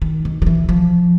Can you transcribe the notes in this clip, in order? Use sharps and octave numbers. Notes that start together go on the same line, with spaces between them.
D#3
D#3
D#3
E3
F3